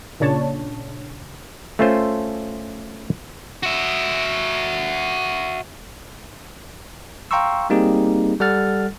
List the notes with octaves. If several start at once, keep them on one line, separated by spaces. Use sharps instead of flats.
A#2 C#3 D4 C#5 A5
A3 C#4 F4 A4 C5
F#4 E5
F5 G5 A#5 C6 C#6 E6
G3 A#3 C4 D#4 G4 G#4
G3 A4 F#5 F6 A6